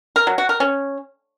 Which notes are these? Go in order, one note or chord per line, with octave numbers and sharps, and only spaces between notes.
A#4
F#3
F#4
A#4
C#4